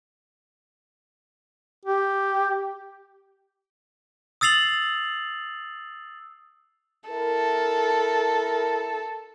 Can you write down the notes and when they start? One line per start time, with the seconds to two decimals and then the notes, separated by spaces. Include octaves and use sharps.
1.86 G4
4.41 D#6 E6 A6 C7 F7 F#7
7.09 E4 A4 A#4